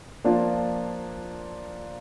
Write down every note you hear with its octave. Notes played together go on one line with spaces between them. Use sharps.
F3 A#3 D4 F4